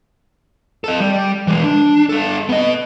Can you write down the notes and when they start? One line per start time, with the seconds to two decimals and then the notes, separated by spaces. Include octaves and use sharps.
0.84 A4 D#5
1.00 G3
1.47 E3 G#3
1.63 D4
2.09 G3 A4
2.49 B3 D#5